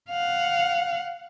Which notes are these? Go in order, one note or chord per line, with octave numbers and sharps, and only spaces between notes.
F5 F#5